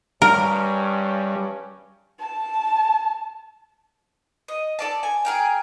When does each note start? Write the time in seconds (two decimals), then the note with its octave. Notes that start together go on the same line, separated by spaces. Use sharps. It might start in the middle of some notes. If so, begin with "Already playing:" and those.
0.22 G2 G3 C#4 A#4
2.20 A5
4.48 D#5
4.79 A4 D5 A5
5.03 G#5
5.25 G#4 A#4 G5